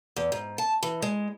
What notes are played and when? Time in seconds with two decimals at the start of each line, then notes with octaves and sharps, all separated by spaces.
0.16 E2
0.32 G#2
0.58 A5
0.83 E3
1.02 G#3